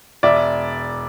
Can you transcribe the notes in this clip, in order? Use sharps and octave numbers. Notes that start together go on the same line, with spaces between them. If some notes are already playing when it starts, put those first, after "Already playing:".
E1 D5 E5